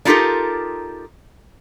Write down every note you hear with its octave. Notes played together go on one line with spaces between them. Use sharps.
D4 D#4 F4 G4 A4 A#4